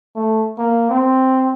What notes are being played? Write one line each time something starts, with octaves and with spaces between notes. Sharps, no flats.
A3
A#3
C4